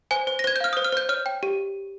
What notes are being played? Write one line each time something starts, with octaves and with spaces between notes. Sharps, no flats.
C5 G#5
C5
A#6
C5 G#6
G6
F5 F6
C5 D#6
F6
C5 G6
C#5 F6
G5
G4